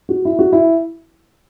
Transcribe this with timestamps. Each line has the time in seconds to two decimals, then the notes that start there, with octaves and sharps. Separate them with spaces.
0.09 F#4
0.25 E4
0.39 F#4
0.52 E4